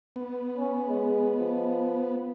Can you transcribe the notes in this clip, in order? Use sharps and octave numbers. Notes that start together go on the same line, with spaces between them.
B3
C#4
G#3
F3